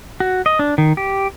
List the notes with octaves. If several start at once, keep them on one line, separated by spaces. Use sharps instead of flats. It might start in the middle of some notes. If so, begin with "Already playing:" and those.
F#4
D#5
D4
D#3
G4